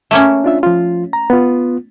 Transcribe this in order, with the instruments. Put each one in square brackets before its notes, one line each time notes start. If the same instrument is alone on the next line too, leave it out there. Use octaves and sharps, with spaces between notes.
[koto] A3 A#3 C#4
[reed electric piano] D4 F4 E5
F3 F4
A#5
B3 F4